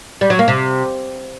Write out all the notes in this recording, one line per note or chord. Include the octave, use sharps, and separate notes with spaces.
G3
F#3
A#3
C3